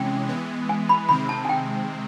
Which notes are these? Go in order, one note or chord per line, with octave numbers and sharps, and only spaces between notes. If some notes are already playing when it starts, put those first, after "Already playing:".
Already playing: C3 E3 G#3 C#4 G5
E3 G#3 B3
G#5
B5
C3 D#3 G#3 C4 B5
A5
G#5
G5